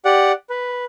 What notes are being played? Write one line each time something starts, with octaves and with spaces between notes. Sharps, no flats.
G4 D5 F#5
B4